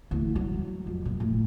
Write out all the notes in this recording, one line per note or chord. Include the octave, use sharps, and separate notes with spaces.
D2 E3
F#3
F2
A#2
A2